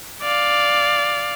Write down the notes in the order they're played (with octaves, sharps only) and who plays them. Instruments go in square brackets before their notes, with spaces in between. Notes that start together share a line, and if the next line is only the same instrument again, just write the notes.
[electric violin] D5 F5